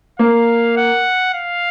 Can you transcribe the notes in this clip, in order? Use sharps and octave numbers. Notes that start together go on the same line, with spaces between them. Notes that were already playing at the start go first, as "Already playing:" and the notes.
A#3 F5
F#5
F5